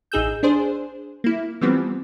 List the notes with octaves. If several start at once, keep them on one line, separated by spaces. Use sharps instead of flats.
A1 D#4 G#4 E6 G6
D4 G#4 C5
A#3 E4
E3 F3 G3 B3 C4